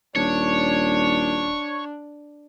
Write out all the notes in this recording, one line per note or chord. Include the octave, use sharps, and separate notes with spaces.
D#1 D4 C#5